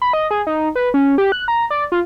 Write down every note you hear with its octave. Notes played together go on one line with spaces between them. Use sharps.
B5
D#5
G#4
D#4
B4
C#4
G4
F#6
A#5
D5
F4